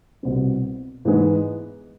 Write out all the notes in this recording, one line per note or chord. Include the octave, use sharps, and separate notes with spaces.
C2 B2 G3 C4
G#2 E3 G#3 B3